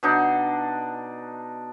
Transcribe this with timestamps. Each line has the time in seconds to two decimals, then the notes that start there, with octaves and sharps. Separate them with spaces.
0.03 B2 D4 D#4